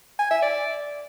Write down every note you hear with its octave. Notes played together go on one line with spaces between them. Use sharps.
G#5
E5
D5